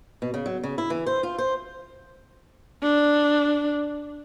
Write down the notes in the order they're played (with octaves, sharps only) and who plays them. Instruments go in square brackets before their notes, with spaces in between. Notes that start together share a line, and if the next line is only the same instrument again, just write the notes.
[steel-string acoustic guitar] B2
C#3
F#3
C#3
E4
E3
C5
F4
C5
[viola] D4